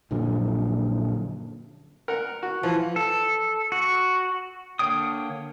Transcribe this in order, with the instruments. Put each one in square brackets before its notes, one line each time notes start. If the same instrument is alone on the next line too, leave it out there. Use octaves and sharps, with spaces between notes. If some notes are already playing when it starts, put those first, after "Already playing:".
[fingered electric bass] A#1 F#2 A#2 D3
[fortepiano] A#4 F#5
F#4
[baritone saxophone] E3 [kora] F3
[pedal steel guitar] A4
F#4
D3 A#3 C#5 G5 D#6